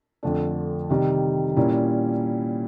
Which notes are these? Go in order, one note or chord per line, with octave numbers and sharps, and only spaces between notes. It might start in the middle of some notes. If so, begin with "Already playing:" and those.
F2 D3 F3 A3 D4
C3 D#3 G3
A#2 G3 A#3 C#4 E4